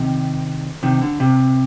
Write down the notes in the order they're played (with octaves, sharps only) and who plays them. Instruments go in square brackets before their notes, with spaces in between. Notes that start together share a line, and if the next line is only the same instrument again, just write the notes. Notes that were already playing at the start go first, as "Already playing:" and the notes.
Already playing: [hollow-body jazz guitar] C3 D#3
C3 D#3
D3
C3